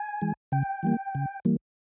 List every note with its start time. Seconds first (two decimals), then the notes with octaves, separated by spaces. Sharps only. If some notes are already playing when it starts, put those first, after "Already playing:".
Already playing: G#5
0.21 E3 G#3
0.52 C#3 G5
0.83 E3 G3 A#3
1.15 C#3
1.45 E3 G3 A#3